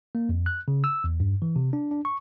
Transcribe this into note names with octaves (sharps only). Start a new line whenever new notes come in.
A#3
F2
F#6
C#3
E6
E2
G2
E3
C3
D4
D4
C#6